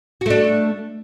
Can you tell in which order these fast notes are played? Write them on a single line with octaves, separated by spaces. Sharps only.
F#4 A3 D4